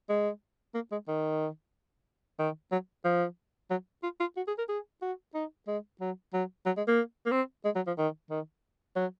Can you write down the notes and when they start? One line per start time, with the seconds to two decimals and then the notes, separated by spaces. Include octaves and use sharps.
0.09 G#3
0.74 A#3
0.92 G#3
1.08 D#3
2.39 D#3
2.72 F#3
3.05 F3
3.70 F#3
4.03 F4
4.20 F4
4.37 F#4
4.47 G#4
4.58 A#4
4.69 G#4
5.02 F#4
5.34 D#4
5.67 G#3
6.01 F#3
6.33 F#3
6.66 F#3
6.77 G#3
6.88 A#3
7.26 A#3
7.31 C4
7.65 G#3
7.76 F#3
7.87 F3
7.98 D#3
8.30 D#3
8.96 F#3